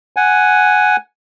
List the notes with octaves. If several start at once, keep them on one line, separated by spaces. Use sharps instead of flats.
F#5 G#5